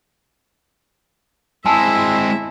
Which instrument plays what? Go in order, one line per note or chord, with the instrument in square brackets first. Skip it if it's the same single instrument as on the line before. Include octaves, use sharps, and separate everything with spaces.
[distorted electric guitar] G#3 C4 [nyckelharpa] E4 E5 [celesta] G#5 A5 E6